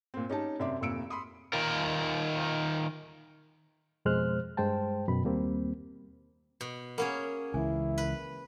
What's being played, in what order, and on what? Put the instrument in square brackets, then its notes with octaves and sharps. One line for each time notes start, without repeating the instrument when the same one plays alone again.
[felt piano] A#2 C4
C#4 D#4 G4 A5
F#2 C3 D5 E5 C6 D6
F1 F2 A#2 E6 C#7 D7
B5 C6 D#6
[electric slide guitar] D#3 F4 A#4
[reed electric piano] F2 B2 G#3 C5 F6 F#6
G2 G#3 C5 G5 A5
F#2 B2 B5
D#2 G3 A#3 C4
[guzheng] B2
[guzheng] A#3 C#4 G#4 [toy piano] A#4 F#5 B5
[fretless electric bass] C#2 E3 [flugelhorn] E4 [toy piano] G#5
[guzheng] B4